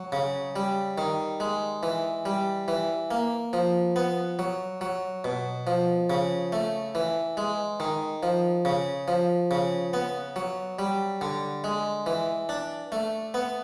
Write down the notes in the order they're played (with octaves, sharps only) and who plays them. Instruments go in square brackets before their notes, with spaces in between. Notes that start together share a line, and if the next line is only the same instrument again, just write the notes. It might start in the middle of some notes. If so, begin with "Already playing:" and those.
Already playing: [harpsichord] F#3
C#3
G3
D#3
G#3
E3
G3
E3
A#3
F3
B3
F#3
F#3
B2
F3
C#3
A3
E3
G#3
D#3
F3
C#3
F3
C#3
B3
F#3
G3
D3
G#3
E3
D4
A3
B3